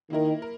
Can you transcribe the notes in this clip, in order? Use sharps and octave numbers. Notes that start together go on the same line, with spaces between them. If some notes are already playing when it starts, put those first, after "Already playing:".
D#3 A#3 E4 A#4
A#4